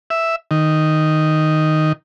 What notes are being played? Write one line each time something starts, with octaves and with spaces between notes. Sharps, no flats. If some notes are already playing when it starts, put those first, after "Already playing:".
E5
D#3